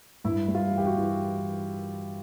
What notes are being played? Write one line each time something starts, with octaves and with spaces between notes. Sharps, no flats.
G2 E4
G3
F4
E3
G4
F#4
E3